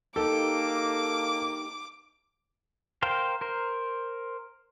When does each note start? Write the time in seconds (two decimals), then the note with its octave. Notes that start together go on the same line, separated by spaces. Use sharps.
0.16 A#3 D#4 G4 A4 D6
3.02 A#4 C5 F5 G5
3.41 A#4 C5